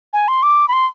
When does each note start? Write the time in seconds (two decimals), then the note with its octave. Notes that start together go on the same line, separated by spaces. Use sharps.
0.13 G#5
0.28 C6
0.43 D6
0.68 B5
0.73 C6